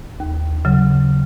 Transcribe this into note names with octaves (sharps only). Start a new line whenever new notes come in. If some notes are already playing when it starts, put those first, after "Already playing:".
D#2
C#3 F#3